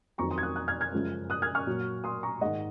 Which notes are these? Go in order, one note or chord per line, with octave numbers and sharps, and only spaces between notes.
F2 D#3 F#3 A#5 C#6
C6 D#6
G#6
D#6 F#6
D#6 F#6
F6 G#6
F6 G#6
F#2 C#3 F3 G#3
D#6 F#6
F6 G#6
C#6 F6
A#2 F#3
C6 D#6
A#5 C#6
G#2 D#3 G#3 D#5 F#5